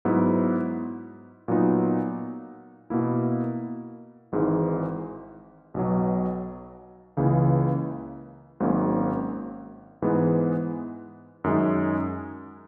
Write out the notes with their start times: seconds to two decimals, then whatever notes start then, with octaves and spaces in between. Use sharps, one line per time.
0.05 G#2 F#3 B3 E4
1.48 A#2 F#3 B3 D#4
2.90 B2 A#3 E4
4.32 G#1 G#2 E3 G#3
5.74 B1 B2 F#3
7.17 C#2 C#3 E3 A#3
8.60 G#1 G#2 F#3 A#3 C#4
10.02 G#2 E3 G#3 B3
11.44 F#2 D#3 G#3 D#4